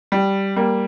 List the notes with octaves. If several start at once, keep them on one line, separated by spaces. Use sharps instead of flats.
G3
G3 A#3